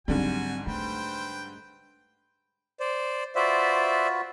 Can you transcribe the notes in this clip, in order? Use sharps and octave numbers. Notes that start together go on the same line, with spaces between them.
G#2 D3 F#3 G3 C4 F#4 G#5
A3 B4 C5 G5
C5 D5
F4 F#4 B4 C5 D5 E5